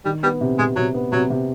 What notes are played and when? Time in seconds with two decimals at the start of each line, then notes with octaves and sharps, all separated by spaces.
0.05 D#3 G3
0.23 G3 B3
0.41 C3
0.58 C3 G#3
0.76 C3 F#3
0.94 B3
1.12 C3 F#3
1.30 C3